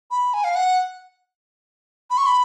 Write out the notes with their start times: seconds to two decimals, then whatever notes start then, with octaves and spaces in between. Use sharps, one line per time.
0.11 B5
0.34 G#5
0.44 F5
0.55 F#5
2.11 B5
2.18 C#6
2.26 B5